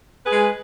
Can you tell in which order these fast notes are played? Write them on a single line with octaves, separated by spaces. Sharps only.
B4 G#4 G#3